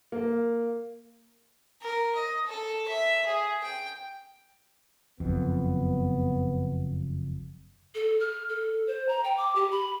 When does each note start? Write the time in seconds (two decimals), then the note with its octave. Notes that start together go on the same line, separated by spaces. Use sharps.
0.12 A#3
1.82 A#4
2.15 D#5
2.46 A4
2.88 E5
3.26 G#4
3.63 G5
5.20 F#1 F2 B3
7.95 A4
8.20 F6
8.49 A4
8.87 C5
9.09 A#5
9.24 G5
9.37 D6
9.55 G4
9.71 B5